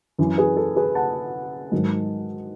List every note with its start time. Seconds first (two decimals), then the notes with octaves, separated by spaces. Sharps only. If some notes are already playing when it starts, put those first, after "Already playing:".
0.18 F#2 E3
0.38 G#4 B4
0.56 A4
0.76 G#4 B4
0.95 F#5 A5
1.72 G#2 D#3 F#3